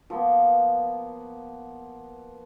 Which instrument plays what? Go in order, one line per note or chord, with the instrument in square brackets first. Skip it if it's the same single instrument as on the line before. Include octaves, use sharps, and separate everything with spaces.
[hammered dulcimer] F3 A#3 B3